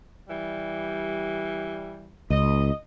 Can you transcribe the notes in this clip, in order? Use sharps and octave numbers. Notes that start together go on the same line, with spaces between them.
E3 G3
C#2 D#5